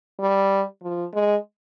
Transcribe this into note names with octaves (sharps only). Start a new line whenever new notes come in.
G3
F3
G#3